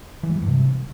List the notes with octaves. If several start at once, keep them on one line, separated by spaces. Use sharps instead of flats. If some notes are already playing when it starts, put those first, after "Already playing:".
E3
G#3
G3
G2
C3